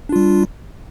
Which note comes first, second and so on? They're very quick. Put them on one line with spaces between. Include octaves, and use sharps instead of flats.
D4 F4 G3